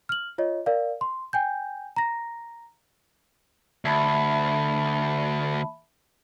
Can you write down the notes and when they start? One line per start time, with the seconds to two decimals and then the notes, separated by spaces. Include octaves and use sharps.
0.09 F6 F#7
0.38 F4 C#5 D#5
0.66 A#4 D5 F5
1.01 C6
1.33 G5 G#5 G6
1.96 A#5 A#6
3.85 D2 E5 A5 B5